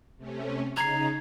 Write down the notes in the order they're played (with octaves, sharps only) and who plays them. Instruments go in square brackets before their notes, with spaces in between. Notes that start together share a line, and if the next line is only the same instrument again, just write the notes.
[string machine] C3 A3 C#4
[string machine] C#3 D#4 [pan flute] A#5 [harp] G#6 C7